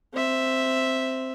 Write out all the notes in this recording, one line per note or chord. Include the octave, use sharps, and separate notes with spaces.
C4 E5